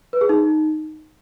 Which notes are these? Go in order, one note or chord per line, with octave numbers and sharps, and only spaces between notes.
B4
G#4
D#4